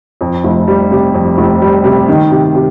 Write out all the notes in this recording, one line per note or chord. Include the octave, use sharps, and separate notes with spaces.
F2
F1
G3
C3
F2
F1
G3
C3
D#3
C3
C3